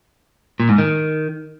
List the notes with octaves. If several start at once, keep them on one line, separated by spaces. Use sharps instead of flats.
A#2
G#2
D#3